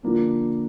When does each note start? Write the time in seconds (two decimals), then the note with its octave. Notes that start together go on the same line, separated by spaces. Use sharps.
0.03 D3 F3 A#3 D4